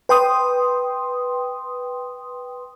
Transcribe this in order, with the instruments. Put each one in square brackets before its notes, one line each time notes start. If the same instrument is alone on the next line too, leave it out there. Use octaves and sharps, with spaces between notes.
[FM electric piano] B4 G5 C6 D#6